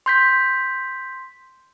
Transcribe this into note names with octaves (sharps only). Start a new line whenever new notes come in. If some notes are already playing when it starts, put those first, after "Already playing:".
C6 G6 B6